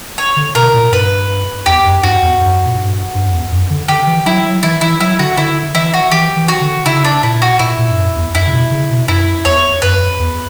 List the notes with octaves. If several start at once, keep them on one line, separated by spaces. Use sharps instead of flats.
C#5
D3
B2 A#4
A#2
G2 B4
E2 G4
F#2
G2 F#4
E2
F#2
A#2
G2
G2
F#2
E2
F#2
D3
D3 G4
E3
F#3 E4
F#3
E3 E4
E3 E4
F#3 E4
D3 F#4
D3 E4
E3 E4
F#4
E3 G4
E3
F#4
D3
C#3 E4
D4
A#2 E4
F#4
A#2 E4
A#2
G2
F#2
E2
F#2 E4
C#3
B2
C#3
B2
F#2 E4
E2 C#5
F#2 B4
E2